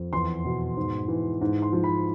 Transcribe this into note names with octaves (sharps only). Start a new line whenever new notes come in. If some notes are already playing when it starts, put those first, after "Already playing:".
Already playing: F2
E2 C6
B2
G#2
E3
G#2
C6
F3
B5